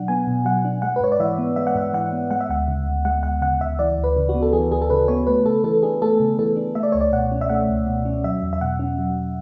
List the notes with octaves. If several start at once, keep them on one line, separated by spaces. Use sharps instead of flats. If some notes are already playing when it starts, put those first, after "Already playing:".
Already playing: B2 F#3 D4 F#5
B3 G#5
B2
F#3 F#5
D4
G#3 F#5
B4
G#2 C#5
D5
E3 E5
B3
G#3 E5
F#5
G#2 E5
E3 F#5
B3
G#3 F#5
E5
D2 F#5
C#3
D2
G#3 F#5
D2 F#5
C#3 F#5
D2 E5
E3 D5
D2
B4
C#3
F#4
B3
A4
E3 G#4
D2 G#4
A4
C#3 B4
B3 C#5
A3 B4
C#3 A4
E3 A4
D4 G#4
A3 A4
C#3
E3 A4
D4
A3 E5
D5
C#2 C#5
D5
B2 F#5
C#4
E5
A3 F#5
C#2
B2
C#4
F#3 E5
E2
E5
B2 F#5
C#4
F#3